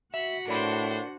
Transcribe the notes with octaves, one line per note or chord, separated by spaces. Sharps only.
F#4 E5 F#5 B5
A2 D4 A#4 C5 D5 B5